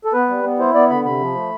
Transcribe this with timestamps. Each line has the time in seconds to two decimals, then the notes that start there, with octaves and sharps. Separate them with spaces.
0.05 A4
0.13 B3 B4
0.29 G3
0.44 B3
0.59 E4 C5
0.74 B3 D5
0.90 D3 B5
1.05 C3 B5
1.20 F3
1.35 A3